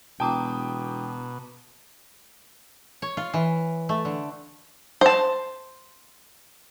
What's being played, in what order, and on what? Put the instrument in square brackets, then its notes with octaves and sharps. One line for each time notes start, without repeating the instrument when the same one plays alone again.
[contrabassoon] E1 [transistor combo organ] B2 [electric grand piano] G5 D#6 [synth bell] A5 A#5 D6
[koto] C#5
F4
E3
A3
D3
[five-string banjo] C5 A5